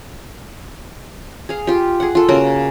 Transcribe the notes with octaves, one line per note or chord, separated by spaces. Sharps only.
G#4 F5
F4 G4
G#4 F#5
F4 A4
C#3 A#3 F#4